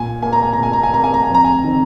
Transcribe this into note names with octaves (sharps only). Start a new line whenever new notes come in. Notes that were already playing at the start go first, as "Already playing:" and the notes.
Already playing: A#2 G#5
A#3 G#5
A#5
G#5
A#2 A#5
G#5
A#5
G#5
A#3 A#5
G#5
A#5
F2 G#5
A#5
G#5
D#3 C4